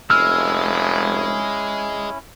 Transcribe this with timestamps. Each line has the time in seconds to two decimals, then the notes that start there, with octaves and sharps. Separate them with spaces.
0.10 F1 G#3 C#4 E4 E6 F6